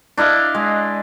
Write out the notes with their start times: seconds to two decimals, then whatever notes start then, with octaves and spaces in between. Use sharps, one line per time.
0.17 D4 E4 D#5 F5
0.54 G#3